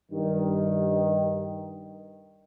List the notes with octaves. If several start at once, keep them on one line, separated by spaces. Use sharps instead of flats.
G2 D#3